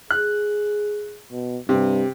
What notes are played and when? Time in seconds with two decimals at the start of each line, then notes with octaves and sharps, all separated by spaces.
0.11 G#4 F#6
1.31 B2
1.69 G2 C3